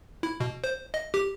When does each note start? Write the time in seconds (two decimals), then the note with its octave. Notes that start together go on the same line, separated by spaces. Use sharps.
0.23 E4
0.40 B2
0.64 C5
0.94 D#5
1.14 G4